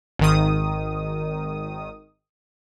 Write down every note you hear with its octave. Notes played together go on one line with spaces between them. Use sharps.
G#1 D#3 D#6